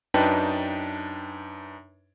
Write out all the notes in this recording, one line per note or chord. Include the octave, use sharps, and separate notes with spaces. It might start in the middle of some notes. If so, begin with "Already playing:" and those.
F#2 D4 D#4 B4 G5 A5